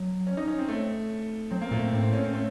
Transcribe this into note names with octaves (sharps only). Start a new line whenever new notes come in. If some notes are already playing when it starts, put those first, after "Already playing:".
Already playing: F#3
C#4
D#4
C#4
C4
A3
F#3 C4
A#3
A#2 A3
C4
A2 C4
C4
C#4
C4
A3